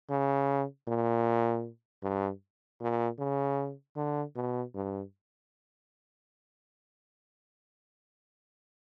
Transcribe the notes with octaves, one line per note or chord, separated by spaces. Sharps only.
C#3
A#2
G2
A#2
C#3
D3
B2
G2